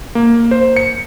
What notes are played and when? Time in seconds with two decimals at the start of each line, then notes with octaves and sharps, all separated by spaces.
0.15 A#3
0.51 C5
0.76 C#7